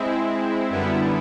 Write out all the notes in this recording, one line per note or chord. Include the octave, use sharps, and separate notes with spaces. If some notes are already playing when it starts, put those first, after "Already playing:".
Already playing: G#3 C4 E4
F#2 D3 G3 B3 E4